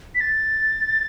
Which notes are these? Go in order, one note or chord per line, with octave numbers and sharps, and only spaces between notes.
B6
A6